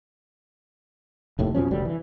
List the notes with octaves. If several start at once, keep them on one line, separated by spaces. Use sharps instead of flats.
F1 D#2 A2
F2 B2 F3 C#4
F1 D2 G3
E3